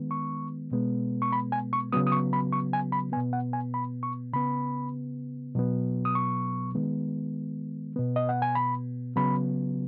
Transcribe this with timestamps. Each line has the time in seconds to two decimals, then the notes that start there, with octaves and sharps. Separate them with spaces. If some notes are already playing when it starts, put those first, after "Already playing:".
Already playing: D#3 G#3 B3
0.11 C#6
0.71 B2 G#3 B3
1.22 C#6
1.32 B5
1.52 G#5
1.73 C#6
1.92 C#3 F#3 B3 D#6
2.07 D#6
2.12 C#6
2.33 B5
2.53 C#6
2.73 G#5
2.92 B5
3.12 B3 G#5
3.17 B2
3.33 F#5
3.53 G#5
3.74 B5
4.03 C#6
4.33 C#3 B3 B5
5.55 B2 F#3 B3
6.05 D#6
6.15 C#6
6.75 D#3 G#3 B3
7.96 B2 B3
8.16 D#5
8.29 F#5
8.42 G#5
8.55 B5
9.16 C#3 F#3 B3 B5